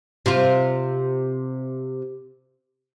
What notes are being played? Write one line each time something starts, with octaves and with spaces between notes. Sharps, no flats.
C3 F4